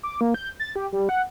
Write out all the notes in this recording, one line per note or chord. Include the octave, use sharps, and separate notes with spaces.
D6
A#3
G6
A6
G4
G3
F#5